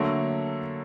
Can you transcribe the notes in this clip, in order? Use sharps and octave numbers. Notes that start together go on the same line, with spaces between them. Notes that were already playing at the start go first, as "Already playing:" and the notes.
Already playing: D3 F#3 A3 A#3